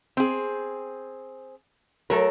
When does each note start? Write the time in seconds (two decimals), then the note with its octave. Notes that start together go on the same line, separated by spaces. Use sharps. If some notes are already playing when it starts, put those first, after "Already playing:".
0.17 C4 G#4
2.10 F#3 A3 A4 A#4